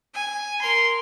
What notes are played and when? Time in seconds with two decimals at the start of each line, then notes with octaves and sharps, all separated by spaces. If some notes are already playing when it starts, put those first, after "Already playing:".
0.14 G#5
0.62 A#4 C6